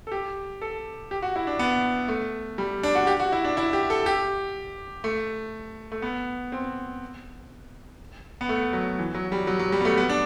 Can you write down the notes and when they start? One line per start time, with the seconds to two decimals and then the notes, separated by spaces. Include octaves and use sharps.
0.07 A4
0.12 G4
0.62 A4
1.11 G4
1.22 F#4
1.36 E4
1.47 D4
1.59 B3
2.08 A3
2.58 G3
2.83 D4
2.95 F#4
3.07 G4
3.20 F#4
3.32 E4
3.44 D4
3.57 E4
3.73 G4
3.90 A4
4.06 G4
5.04 A3
5.92 A3
6.02 B3
6.52 C4
8.41 B3
8.49 A3
8.73 F#3
8.99 E3
9.15 F#3
9.32 G3
9.47 F#3
9.59 F#3
9.72 G3
9.81 B3
9.85 A3
9.98 B3
10.09 D4